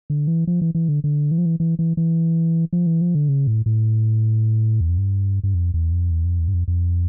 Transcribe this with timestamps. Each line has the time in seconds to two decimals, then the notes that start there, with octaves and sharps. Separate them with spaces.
0.10 D3
0.27 E3
0.47 F3
0.62 E3
0.75 E3
0.89 D3
1.04 D3
1.31 E3
1.38 F3
1.46 E3
1.60 E3
1.79 E3
1.97 E3
2.73 F3
2.87 E3
3.01 F3
3.15 D3
3.29 C#3
3.47 A2
3.66 A2
4.81 E2
4.89 F2
4.98 G2
5.44 G2
5.54 F2
5.74 E2
5.92 F2
6.11 E2
6.25 F2
6.39 E2
6.48 G2
6.54 F2
6.68 F2